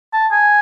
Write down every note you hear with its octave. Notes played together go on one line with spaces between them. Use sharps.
A5
G#5